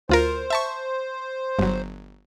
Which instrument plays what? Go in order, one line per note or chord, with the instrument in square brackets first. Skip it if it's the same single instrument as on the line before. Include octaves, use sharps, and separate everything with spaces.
[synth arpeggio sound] D2 F4 A#4 [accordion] C5
[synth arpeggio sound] E5 A5 C#6
G1 F#3